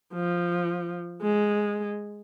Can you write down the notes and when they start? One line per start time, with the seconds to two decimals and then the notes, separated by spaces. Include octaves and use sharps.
0.14 F3
1.22 G#3